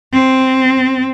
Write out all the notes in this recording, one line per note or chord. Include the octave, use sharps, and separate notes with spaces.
C4